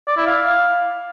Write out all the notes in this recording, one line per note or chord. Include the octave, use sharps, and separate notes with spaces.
D5
E4
F5